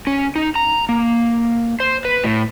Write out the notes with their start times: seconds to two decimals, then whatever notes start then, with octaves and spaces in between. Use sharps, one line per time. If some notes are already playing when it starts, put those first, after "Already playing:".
0.07 C#4
0.36 D#4
0.55 A#5
0.89 A#3
1.80 C5
2.05 B4
2.24 A2